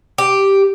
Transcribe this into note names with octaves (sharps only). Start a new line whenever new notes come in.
G4